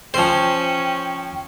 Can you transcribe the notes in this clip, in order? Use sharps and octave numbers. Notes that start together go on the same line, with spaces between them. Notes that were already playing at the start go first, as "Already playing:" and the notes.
F3 C#4 C5 G5